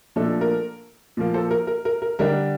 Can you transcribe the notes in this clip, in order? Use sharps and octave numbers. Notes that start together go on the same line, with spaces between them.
A#2 F3 A3 D4 A4
A#4
A#2 F3 A#3
A4 C5
A#4
A#4
A#4
A#4
D3 G3 D4 A#4